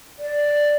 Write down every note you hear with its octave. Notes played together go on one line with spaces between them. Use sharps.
D5